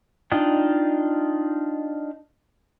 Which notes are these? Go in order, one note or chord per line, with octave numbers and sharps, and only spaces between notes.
D4 D#4 F4 D#5 G5